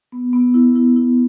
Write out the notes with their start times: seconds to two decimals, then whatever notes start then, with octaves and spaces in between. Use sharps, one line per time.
0.12 B3
0.33 B3
0.54 E4
0.75 E4
0.96 E4